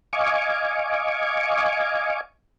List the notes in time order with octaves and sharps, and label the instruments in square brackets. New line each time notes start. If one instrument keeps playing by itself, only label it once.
[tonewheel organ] D#5 F5 G#5 C#6 D6